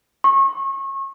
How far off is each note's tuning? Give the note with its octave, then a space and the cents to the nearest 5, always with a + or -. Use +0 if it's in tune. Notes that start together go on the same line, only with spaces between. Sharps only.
C#6 -30